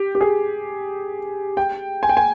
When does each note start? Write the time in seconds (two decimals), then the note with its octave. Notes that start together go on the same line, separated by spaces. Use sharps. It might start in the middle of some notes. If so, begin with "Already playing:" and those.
Already playing: G4
0.15 G4
0.21 G#4
1.57 G5
2.03 G#5
2.09 G5
2.17 G#5